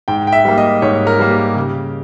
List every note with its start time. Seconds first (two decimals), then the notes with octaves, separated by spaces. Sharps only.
0.08 G#2 G5
0.27 G5
0.32 E5
0.45 G3 A#3
0.58 D#5
0.82 G#2 C#5
1.07 A#4
1.19 G3 A#3
1.31 G4
1.56 C#3